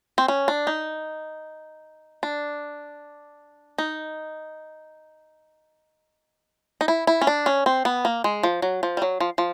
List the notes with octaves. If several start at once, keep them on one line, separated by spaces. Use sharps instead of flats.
C4
C#4
D4
D#4
D4
D#4
D#4
E4
E4
C#4
D4
C#4
C4
B3
A#3
G#3
F3
F#3
F3
G3
F#3
F3
F3